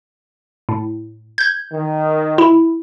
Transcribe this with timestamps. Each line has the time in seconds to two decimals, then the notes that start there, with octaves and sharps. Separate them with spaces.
0.69 A2
1.38 G6 G#6
1.73 D#3
2.38 E4